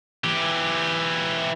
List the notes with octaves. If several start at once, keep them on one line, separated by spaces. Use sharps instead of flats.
E3 G4